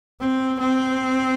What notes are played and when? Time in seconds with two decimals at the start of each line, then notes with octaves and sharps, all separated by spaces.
0.21 C4
0.60 C4